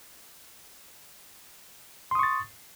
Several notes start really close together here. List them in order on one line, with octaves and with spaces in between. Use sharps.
C6 D#6 C#6 A6